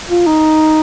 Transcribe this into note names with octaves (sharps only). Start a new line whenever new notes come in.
F4
D#4